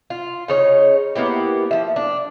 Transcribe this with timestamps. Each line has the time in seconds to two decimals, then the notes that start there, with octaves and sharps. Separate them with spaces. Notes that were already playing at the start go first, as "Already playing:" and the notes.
0.10 F4
0.48 C#3 D#4 C#5
1.16 A#3 B3 E4 G4
1.71 F3 E5
1.96 D4